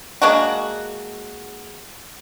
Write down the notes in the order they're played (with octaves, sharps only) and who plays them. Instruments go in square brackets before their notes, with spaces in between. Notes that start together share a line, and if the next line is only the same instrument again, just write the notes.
[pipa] G#3 A#3 D4 F#4